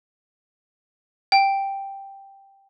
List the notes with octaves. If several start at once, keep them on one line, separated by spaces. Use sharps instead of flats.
G5